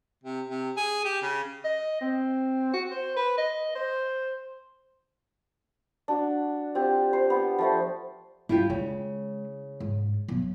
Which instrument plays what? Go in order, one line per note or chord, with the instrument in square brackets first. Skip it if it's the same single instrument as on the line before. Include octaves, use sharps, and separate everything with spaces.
[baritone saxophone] C3
C3
G#4
G4
C#3
[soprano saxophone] D#5
C4
F#4
C5
B4
D#5
C5
[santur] D4 F#4
C4 F4 G4
C5
B3
F3 A3 C5
[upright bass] G2 [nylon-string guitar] E4 F4 G4
[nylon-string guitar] C#3 [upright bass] G#3
[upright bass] G#2
B1 F#3